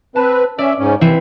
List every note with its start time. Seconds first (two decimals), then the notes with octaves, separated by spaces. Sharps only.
0.16 C4 B4 A5
0.59 C#4 D5 E5
0.79 G#2 C#4
1.01 D#2 E3 C4 E4